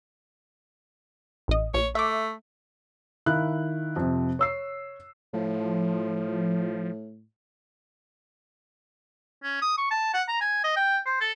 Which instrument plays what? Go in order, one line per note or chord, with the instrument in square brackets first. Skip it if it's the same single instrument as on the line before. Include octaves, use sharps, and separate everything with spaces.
[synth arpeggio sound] A1 D#5
[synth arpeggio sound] A#1 [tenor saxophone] C#5
[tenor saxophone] A3 [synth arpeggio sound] E5 D6
[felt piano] D#3 E4 F5 F#6
F2 C3
C#5 E6 C7
[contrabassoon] A2 [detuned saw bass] F3
[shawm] C#4
D#6
C#6
A5
F#5
A#5
G#5
D#5
G5
C5
A4